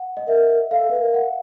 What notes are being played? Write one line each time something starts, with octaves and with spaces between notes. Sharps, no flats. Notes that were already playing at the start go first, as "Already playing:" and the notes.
Already playing: F#5
D#5
A#4 E5
A4 F5
B4
A#4
F#5